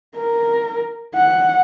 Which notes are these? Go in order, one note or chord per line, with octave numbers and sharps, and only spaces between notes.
A#4
F#5